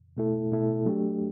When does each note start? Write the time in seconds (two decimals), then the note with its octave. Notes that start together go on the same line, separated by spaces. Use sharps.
0.17 B2 A3 E4 A4
0.52 B2 A3 E4 A4
0.86 F#3 A3 D4 G4